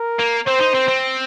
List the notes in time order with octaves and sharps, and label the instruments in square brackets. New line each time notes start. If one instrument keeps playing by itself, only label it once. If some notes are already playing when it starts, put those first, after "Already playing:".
Already playing: [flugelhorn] A#4
[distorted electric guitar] A#3
[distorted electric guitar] C4 [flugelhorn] C5
[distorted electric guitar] D#4
C4
C4